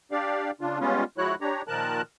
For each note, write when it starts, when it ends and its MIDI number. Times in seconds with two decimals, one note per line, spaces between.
0.12 0.51 62
0.12 0.51 67
0.12 0.51 74
0.12 0.51 77
0.61 0.79 49
0.61 0.79 62
0.61 0.79 65
0.80 1.04 55
0.80 1.04 56
0.80 1.04 59
0.80 1.04 61
0.80 1.04 65
1.18 1.35 53
1.18 1.35 56
1.18 1.35 64
1.18 1.35 66
1.18 1.35 73
1.18 1.35 90
1.41 1.62 62
1.41 1.62 67
1.41 1.62 73
1.41 1.62 82
1.68 2.02 46
1.68 2.02 51
1.68 2.02 53
1.68 2.02 70
1.68 2.02 81
1.68 2.02 90